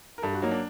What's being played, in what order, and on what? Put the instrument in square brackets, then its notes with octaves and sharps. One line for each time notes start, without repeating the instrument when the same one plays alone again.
[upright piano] A#4
[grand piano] G2 [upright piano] A4
[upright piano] F#4
[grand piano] F#3 A#3 [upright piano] D#4
[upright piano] D4